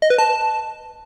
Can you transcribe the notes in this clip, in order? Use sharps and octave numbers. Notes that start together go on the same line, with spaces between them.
D#5
B4
A5